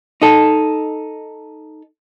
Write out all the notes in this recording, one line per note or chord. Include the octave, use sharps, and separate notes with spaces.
D#4 A4